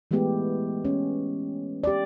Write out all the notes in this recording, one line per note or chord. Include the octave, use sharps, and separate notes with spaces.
E3 G#3 A3 B3 G4
C#4
G4 D5